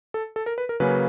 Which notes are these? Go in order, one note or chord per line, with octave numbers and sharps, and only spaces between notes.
A4
A4
A#4
B4
A#4
C#3 F#3 A#3 C#4 B4